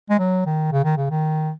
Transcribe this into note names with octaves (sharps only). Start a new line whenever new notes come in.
G#3
F#3
D#3
C#3
D#3
C#3
D#3